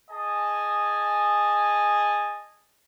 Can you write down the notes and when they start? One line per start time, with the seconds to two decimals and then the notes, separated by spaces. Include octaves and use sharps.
0.11 G#4 D#5 G#5 A5